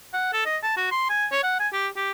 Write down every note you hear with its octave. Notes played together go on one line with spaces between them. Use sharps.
F#5
A4
D#5
A5
F#4
C6
G#5
C#5
F#5
G#5
G4
G4